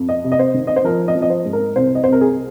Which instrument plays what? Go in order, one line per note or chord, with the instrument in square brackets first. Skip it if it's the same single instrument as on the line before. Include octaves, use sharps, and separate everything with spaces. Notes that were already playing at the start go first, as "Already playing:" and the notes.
Already playing: [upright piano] F2
D#5
C3
D#5
C5
D#3
D#5
C5
F3 A#4
D#5
F3
D#5
C5
G#2
A#4
C2 C5
D#5
C3 C5
A#4
G#4